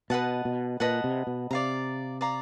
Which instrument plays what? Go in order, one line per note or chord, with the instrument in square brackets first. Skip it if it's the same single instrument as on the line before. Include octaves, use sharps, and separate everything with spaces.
[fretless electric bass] B2 [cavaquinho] B4 D#5 F#5 A5
[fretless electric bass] B2
[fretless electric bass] A#2 [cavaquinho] B4 D#5 F#5 A5
[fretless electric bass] C3
B2
[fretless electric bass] C3 [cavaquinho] D5 F5 A#5
[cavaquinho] D5 F5 A#5